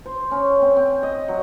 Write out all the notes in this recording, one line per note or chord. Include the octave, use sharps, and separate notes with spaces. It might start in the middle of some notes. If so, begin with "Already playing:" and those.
C5
C#4
C4
C4
D#5
F#3